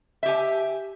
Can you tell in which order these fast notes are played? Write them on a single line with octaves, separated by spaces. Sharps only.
E5 G4 G#5